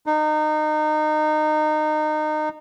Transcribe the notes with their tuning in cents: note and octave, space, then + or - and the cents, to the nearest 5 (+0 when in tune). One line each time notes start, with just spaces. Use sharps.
D#4 -25